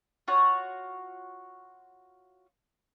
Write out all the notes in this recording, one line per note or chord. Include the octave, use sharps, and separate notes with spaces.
F4 F#4 C#5 F#5